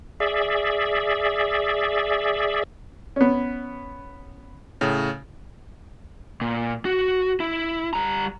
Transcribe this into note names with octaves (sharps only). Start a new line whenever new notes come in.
G#4 D5 E5
B3 C#4
A2 C#3
A#2
F#4
E4
G3 A#5